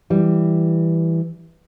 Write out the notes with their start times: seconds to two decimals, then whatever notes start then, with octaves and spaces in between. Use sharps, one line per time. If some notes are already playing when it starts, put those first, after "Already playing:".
0.10 E3 G3